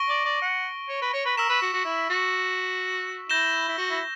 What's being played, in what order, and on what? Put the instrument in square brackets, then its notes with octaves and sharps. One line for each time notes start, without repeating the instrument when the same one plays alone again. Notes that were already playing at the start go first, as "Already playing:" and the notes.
Already playing: [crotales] C#6 A#6 D7 G7
[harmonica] D5
D5
F#5
C#5
B4
C#5
B4
[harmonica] A#4 [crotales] E6 B6 E7
[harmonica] B4
F#4
F#4
E4
F#4
[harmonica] E4 [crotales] G6 A#6 E7 G7
[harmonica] E4
F#4
E4